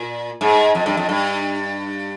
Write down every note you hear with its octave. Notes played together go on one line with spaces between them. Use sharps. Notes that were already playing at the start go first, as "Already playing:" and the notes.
Already playing: A#2
G#2
F2
G2
F2
G2